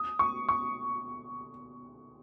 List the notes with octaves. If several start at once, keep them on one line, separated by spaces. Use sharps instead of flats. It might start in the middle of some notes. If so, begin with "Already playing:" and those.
Already playing: D#6
C#6
C#6